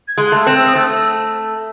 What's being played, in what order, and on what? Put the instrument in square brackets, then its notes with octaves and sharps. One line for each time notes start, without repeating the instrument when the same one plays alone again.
[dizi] G#6
[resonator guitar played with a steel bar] G#3
[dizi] F#6
[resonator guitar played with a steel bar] A3
[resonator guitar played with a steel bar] C4 [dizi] F#6
[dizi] E6
D#6
[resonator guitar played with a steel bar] A3 [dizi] E6